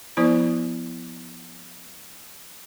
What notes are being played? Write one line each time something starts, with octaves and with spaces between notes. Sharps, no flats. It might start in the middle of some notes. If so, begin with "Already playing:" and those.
F3 B3 E4 C5